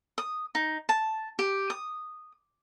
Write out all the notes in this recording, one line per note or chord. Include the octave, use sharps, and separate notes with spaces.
D#6
D#4
A5
G4
D#6